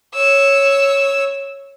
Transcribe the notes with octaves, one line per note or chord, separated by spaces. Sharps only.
C#5 E6